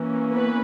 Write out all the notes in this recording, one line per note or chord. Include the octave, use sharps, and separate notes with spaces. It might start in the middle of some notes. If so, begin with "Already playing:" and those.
Already playing: E3 A#3 C#4
B3 B4